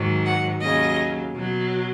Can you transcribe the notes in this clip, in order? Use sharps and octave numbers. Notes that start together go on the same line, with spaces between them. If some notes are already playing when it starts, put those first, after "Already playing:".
Already playing: G#2 D#3 F#3
F#5
D#2 C#3 F#3 D#5
B2 F#3